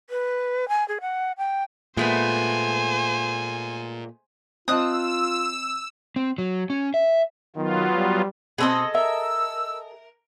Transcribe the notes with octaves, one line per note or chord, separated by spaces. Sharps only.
B4
G#5
G#4
F#5
G5
A#2 G#3 A3 B3 C5 G#5
C4 F4 D#5 A5 D#6 E6 F#6
C4
F#3
C#4
E5
D#3 F#3 B3 F4
G3
B2 C4 G#4 A4 D#5
A#4 E5 E6